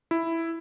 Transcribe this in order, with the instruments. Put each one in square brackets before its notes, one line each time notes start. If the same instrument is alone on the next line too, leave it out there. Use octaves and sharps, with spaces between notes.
[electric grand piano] E4